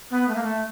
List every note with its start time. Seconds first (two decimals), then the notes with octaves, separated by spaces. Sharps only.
0.10 B3
0.28 A3
0.35 A#3
0.42 A3